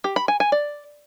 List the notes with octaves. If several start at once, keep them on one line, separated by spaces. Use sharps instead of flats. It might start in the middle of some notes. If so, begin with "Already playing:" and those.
G4
B5
G#5
G#5
D5